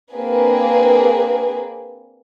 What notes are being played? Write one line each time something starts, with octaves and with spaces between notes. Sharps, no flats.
A#3 C4 D4 G#4 B4